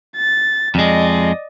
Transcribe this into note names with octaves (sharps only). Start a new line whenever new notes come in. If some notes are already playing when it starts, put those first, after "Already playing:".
A6
F2 G#3 D5 D#5